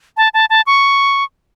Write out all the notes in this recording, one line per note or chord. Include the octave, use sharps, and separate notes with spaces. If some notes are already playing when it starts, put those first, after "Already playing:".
A5
A5
A5
C#6